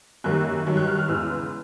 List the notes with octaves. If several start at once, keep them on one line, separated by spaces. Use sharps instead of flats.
F#2 D#3 G3 A#3 F#6
G2 D#3 F#3
F#6
F6
F6
E2 C#3 E3 G#3 B3 E6